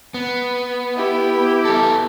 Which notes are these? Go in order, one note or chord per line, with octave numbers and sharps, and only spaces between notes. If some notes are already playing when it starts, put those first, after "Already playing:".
B3
E4 G4
B3 A4